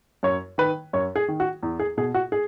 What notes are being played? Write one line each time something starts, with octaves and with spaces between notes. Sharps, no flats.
F#2 C#5
D#3 B4
F#2 C#5
G#4
D#3
F#4
E2
G#4
B2 G#4
F#4
G#4